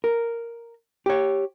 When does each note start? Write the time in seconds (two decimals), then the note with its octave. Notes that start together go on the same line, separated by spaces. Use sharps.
0.04 A#4
1.06 G4 C#5